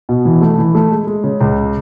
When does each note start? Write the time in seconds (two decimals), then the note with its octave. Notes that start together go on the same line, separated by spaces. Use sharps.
0.09 B2
0.25 E3
0.41 A3
0.58 E3
0.75 A3
0.92 G#3
1.07 G#3
1.24 C#3
1.41 C#2